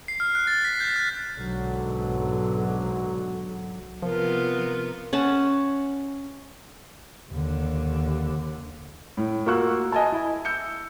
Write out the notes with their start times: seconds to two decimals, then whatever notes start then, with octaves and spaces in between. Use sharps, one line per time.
0.08 C7
0.20 F6
0.35 F#6
0.47 A6
0.65 B6
0.80 G6
0.96 F#6
1.35 B1 G#2 D3 F#3
4.02 C3 F3 B3 F4 A#4
5.13 C#4 F#5 A5
7.31 D#2 D3
9.17 A2
9.46 A#3 F4 F#4 C#6 E6 F#6
9.92 D#5 G#5 A5
10.12 E4
10.45 E6 G6 C#7